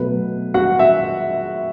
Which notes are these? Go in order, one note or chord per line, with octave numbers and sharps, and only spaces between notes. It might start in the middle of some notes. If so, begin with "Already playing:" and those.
Already playing: B2 F#3 A3 B4
F#4 F#5
E5